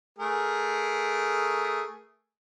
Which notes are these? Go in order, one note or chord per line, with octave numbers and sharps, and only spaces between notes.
A3 G#4 A#4